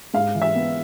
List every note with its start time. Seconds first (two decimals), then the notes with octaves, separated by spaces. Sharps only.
0.14 G#2 F5
0.35 E3
0.42 E5
0.55 B3